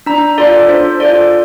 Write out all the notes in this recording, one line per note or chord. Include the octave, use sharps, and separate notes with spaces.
D4 A#5
F4 A4 D5
D4 C5
F4 A4 D5